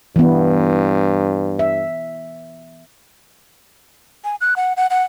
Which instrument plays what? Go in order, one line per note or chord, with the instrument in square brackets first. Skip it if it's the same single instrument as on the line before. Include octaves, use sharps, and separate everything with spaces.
[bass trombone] G2 [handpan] E3 B3
[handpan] E5
[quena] G#5
F#6
F#5
F#5
F#5